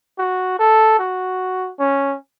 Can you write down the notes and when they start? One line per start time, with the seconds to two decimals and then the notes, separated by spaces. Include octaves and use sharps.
0.18 F#4
0.59 A4
0.99 F#4
1.79 C#4